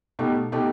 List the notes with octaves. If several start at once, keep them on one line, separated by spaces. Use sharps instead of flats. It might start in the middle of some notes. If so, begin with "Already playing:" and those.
B2 A3 D#4 G4
B2 A3 D#4 G4